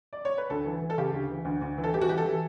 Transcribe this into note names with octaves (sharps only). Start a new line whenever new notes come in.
D5
C#5
B4
D2 A4
E3
E3
A4
C#3 G4
D2
E3
D2
D2
E3
A4
E3 G4
F#4
E3 G4
A4
E3